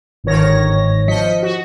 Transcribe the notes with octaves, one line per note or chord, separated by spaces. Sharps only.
G1 G#2 D#3 C#5 A#6
F3 D#5 B6 C#7
F#4